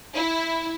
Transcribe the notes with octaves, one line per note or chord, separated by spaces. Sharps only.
E4